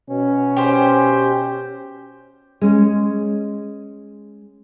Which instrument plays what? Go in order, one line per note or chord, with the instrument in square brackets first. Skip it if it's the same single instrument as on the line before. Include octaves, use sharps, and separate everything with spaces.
[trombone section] B2 C#4
[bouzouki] G4 C5
[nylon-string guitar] G#3 C#4